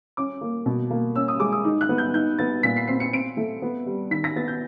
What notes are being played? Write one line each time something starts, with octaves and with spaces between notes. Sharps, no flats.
C#4 D6
A#3
B2
A#3
C#4 E6
D#6
G#3 D6
D#6
D#4
F#6
B3
G6
D#4 G6
B3 A6
A#2 B6
C7
C4 C7
C#7
C4 D7
A3
B3
G3
D#3 B6
A#6
B3 A6
G6